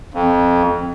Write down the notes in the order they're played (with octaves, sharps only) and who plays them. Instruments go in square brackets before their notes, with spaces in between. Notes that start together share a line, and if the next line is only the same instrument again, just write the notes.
[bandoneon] F2